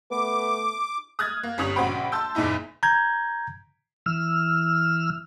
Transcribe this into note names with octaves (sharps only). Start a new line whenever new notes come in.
A3 B3 D6
D#6 F6 F#6 G#6 A6
A#3
G1 G3 C#4 D#6 F7 F#7
A#1 C#3 F#4 C5 G5 B5
A5 C6 E6 G6
F#1 E2 A#2 D#4 E4
A#5 G6 G#6
E3 E6 F6